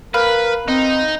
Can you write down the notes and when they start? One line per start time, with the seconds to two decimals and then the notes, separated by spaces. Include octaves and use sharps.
0.14 A#4 B4 F5
0.68 C4 D#4